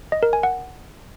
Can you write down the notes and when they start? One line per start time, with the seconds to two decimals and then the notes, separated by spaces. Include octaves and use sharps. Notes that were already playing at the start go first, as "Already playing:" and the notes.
0.12 D#5
0.23 A#4
0.33 G#5
0.43 F#5